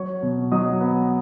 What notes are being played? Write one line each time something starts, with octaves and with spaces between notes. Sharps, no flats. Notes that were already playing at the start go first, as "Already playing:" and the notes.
Already playing: F#3 C#5 C#6
B2
F#3 D#5 D#6
B3